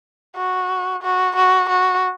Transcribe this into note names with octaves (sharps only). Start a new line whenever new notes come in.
F#4
F#4
F#4
F#4